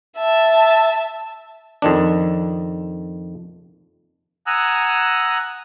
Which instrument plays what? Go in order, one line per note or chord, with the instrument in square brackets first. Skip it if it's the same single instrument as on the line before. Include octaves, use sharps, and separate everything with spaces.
[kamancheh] E5 A5
[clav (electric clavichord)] F2 D#3 D4
[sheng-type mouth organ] F#5 G#5 A#5 D#6 E6 F#6